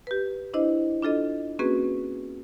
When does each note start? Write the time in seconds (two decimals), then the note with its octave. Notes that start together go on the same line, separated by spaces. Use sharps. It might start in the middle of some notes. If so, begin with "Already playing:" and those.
0.07 G4 B4
0.54 D4 E4 C5 D#5
1.02 D4 F4 A4 D#5
1.59 A#3 C4 C#4 F#4 G#4 B4